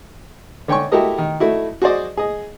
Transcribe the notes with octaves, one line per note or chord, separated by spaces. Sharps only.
D3 C#5 G5 G#5 C#6
E4 F#4 G4 A4 A#4 D#5
D#3
A3 D#4 E4 F#4
F#4 G#4 C5 D5 D#5
G#4 D#5